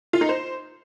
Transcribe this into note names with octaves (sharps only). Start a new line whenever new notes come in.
F4
D#4
C5